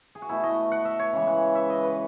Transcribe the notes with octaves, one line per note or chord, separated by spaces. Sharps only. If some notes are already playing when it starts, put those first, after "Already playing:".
G#4
F#4
B2 A3 E4
D#5
F#5
E5
C#5
C#3 E3 G#3
F#5
E5
D#5
B4